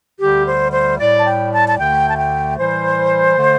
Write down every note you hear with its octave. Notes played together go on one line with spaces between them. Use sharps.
D2 D3 G3 G4
C5
C5
A2 G3 D5
A5
G5
A5
A5
D2 D3 A3 G5
A5
G5
A2 E3 G3 C5
D3 A3